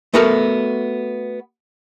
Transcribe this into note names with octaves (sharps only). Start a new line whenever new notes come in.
A3 B3 F#4 A4 A#4